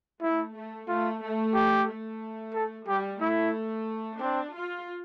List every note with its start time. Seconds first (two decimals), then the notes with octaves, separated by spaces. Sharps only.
0.22 A3 E4
0.55 A3
0.88 A3 F4
1.22 A3
1.54 G4
1.88 A3
2.54 A4
2.87 G3 G4
3.21 A3 E4
4.20 C4 D4
4.54 F4